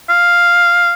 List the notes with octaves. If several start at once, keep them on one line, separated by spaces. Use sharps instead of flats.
F5